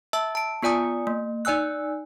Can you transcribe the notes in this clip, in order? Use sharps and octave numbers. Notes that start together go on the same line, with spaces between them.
E5 A5 E6
A5 D7
B3 F4 D5 G#5 D#6
A#3
D#4 D5 G#5 E6 F#6